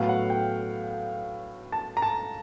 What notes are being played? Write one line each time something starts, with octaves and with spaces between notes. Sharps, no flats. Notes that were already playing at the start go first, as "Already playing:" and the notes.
Already playing: A2 F#3 B3 F5
F#5
G5
A5
A#5
A5